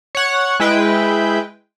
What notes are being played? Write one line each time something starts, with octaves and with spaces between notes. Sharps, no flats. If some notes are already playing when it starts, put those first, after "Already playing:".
C#5 F#5
G#3 E4 B4 G5